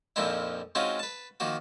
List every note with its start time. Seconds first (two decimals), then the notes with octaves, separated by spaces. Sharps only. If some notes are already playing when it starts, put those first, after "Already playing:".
0.16 A#1 F2 F3 C4 D#4 E4
0.75 G#3 C4 C#4 D#4 F4 F#4
0.99 B4 A5
1.40 D#3 F3 A#3 F#4